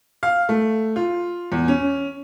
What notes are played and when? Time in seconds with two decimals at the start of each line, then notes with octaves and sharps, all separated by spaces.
0.23 F5
0.49 A3
0.96 F4
1.52 E2
1.68 C#4